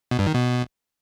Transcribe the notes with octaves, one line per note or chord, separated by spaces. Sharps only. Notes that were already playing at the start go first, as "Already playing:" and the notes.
B2
G2
D#3
B2